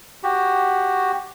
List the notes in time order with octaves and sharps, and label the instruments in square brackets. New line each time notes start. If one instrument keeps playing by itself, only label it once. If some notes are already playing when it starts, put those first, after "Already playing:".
[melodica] F#4 G4